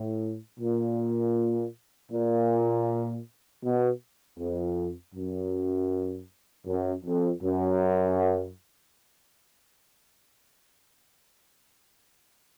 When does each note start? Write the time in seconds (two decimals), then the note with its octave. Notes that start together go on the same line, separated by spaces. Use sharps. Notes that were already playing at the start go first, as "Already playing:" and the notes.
Already playing: A2
0.60 A#2
2.12 A#2
3.64 B2
4.39 F2
5.15 F#2
6.66 F#2
7.05 F2
7.43 F#2